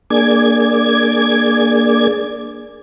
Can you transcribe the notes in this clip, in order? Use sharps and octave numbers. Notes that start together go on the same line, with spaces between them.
A#3 D4 G#4 D5 G#6